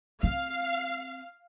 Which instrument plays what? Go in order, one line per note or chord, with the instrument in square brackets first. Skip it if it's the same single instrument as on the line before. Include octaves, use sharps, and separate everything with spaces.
[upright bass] C4 [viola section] F5